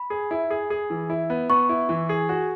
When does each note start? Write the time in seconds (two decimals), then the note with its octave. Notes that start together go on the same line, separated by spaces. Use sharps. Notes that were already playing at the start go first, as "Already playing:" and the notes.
Already playing: B5
0.10 G#4
0.31 E4
0.50 G#4
0.70 G#4
0.90 E3
1.10 E4
1.30 B3
1.49 B3 C#6
1.69 E4
1.89 E3
2.09 G#4
2.29 F#4